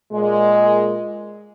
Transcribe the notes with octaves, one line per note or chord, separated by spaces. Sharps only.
A#2 G#3